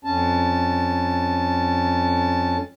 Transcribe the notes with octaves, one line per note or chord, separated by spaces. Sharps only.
F2 C#4 A5